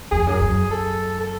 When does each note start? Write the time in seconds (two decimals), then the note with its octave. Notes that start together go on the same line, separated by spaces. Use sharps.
0.11 F2 G#4
0.27 F#2
0.41 F#2
0.71 A4
1.20 A4